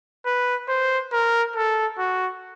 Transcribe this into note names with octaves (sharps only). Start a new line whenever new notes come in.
B4
C5
A#4
A4
F#4